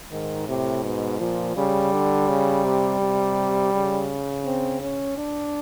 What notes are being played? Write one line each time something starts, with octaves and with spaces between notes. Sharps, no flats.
G#2 D#3
A2 C3
G#2 B2
A#2 F3
C#3 G3
D3
C#3
C3
C3
C#3
C4
C#4
D4